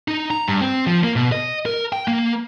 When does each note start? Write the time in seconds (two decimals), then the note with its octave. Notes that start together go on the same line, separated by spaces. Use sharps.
0.08 D#4
0.31 A#5
0.48 G2
0.61 C4
0.87 F3
1.04 A#3
1.16 B2
1.32 D#5
1.66 A#4
1.92 G5
2.08 A#3